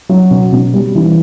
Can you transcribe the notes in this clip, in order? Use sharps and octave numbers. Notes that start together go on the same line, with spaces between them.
F#3
B2
B2
G3
E3